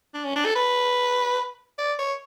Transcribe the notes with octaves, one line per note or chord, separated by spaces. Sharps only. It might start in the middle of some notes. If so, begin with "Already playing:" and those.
D4
C#4
D4
A4
B4
D5
C#5